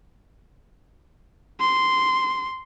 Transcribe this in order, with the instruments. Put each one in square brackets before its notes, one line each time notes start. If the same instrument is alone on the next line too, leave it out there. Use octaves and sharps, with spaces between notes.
[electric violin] C6